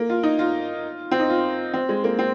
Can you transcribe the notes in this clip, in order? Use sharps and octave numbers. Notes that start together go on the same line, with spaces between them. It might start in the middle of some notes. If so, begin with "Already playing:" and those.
Already playing: A#3
F4
D#4
F4
C4
D#4
F4
C4
G#3
A#3
C4